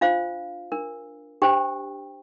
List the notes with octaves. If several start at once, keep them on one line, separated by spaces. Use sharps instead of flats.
D4 F4 C5 F5
D4 A#4
D4 G4 C5 G5